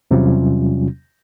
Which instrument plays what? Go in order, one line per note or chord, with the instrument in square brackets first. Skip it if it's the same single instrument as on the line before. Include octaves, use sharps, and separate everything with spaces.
[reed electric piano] E2 C3 F#3 G3 C#4 F4